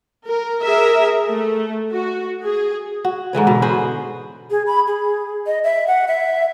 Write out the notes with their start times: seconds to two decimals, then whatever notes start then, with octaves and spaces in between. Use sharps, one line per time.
0.25 A#4
0.62 G#4 A#4 E5
1.28 A3
1.92 F#4
2.44 G#4
3.04 F#4
3.33 G#2 D3 E3 C#5
3.47 B2
3.62 B3 F#4 G#4 C5
4.51 G#4
4.67 B5
4.87 G#4
5.47 D#5
5.64 E5
5.87 F#5
6.08 E5